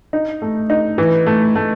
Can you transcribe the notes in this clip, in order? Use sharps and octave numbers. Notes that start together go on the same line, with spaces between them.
D#4
A3
D#4
E3
A3
A3